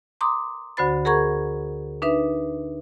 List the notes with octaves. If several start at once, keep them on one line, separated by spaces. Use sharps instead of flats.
A#5 C6 D6 D#6
D2 D3 F#4 C5 B5 A6
G#4 A#4 F#5 A#5 C#6 G#6
D4 D#4 B4 E5